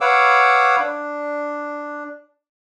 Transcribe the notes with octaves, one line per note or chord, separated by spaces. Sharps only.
B4 C#5 F5 F#5 D6 E6
D4